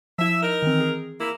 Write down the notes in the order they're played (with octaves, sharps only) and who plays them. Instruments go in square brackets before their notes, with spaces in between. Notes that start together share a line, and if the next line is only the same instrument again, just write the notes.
[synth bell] F3 E4 [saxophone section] E5
[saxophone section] D#4 A#4
[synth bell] D#3 E3 C4
G#4
[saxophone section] A#3 E4